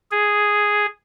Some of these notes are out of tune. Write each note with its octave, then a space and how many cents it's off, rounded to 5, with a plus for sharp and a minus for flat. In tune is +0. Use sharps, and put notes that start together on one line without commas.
G#4 +0